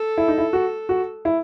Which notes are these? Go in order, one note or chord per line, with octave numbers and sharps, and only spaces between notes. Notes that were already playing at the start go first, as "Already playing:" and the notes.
Already playing: A4
E4
D#4
E4
F#4
F#4
E4